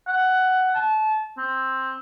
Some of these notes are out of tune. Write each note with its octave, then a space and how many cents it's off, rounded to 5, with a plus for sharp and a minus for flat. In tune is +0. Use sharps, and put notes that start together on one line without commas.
F#5 +10
A5 -25
C4 +10